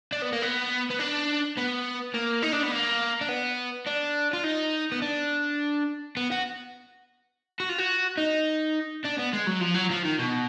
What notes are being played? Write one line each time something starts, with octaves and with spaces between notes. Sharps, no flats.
D4
B3
A#3
B3
B3
D4
B3
A#3
D#4
D4
B3
A#3
D4
B3
D4
F4
D#4
B3
D4
B3
F#4
F#4
F4
F#4
D#4
D4
B3
G#3
F#3
F3
F#3
F3
D#3
B2